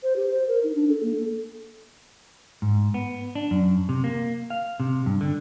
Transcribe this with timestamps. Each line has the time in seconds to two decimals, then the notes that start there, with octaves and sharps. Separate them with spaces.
0.03 C5
0.16 G4
0.31 C5
0.48 A#4
0.63 D#4
0.75 D4
0.89 A4
1.03 A#3
1.16 A4
2.62 G#2
2.94 B3
3.35 D4
3.51 F#2
3.89 C3
4.04 A#3
4.50 F5
4.80 C3
5.06 G2
5.21 D3